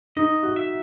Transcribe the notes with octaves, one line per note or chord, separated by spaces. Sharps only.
D#4 D#5
F#4
E5